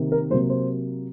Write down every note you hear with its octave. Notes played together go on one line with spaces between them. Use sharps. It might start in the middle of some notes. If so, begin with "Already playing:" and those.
Already playing: C3 D#3 A#3
A#4
C3 F#3 A#3 C5
C5